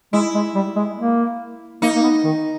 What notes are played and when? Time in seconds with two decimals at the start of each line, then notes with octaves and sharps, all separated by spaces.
0.13 G#3 E4
0.34 G#3
0.55 G3
0.76 G#3
0.98 A#3
1.82 A#3 D#4
1.96 A#3
2.03 B3
2.24 D#3